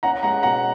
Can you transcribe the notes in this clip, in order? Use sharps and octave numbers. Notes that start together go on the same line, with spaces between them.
C#4 F#5 A#5
G#3 F#5 A#5
B2 F#5 A#5